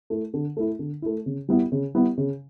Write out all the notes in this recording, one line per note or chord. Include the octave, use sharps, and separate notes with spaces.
A3 E4
D3
A3 E4
D3
A3 E4
C#3
G3 B3 E4
C#3
G3 B3 E4
C#3